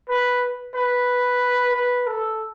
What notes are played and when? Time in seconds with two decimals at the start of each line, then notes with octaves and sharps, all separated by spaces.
0.09 B4
0.75 B4
1.74 B4
2.07 A4